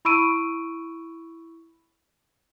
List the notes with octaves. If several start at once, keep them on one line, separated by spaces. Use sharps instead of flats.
E4 B5 C#6 E6 D7 D#7